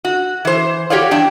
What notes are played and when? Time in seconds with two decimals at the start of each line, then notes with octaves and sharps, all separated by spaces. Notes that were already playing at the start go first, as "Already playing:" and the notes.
0.05 F#4
0.45 E3 C5
0.90 F#4 G4 A4 C#5 D5 F5
1.11 E2 D4 G5